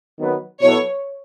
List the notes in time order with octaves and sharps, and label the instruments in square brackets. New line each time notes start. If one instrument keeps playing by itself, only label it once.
[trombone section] D#3 F#3 B3
[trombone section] B2 F#3 B3 E4 A4 [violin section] C#5